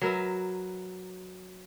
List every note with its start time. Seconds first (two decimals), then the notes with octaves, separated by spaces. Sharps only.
0.02 F#3 A#4 B4 E5